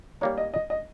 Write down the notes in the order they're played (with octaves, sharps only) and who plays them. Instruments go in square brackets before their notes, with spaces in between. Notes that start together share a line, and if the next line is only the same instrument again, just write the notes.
[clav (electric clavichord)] G3 A#3 D#4 [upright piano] C#5
[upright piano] D#5
D#5
D#5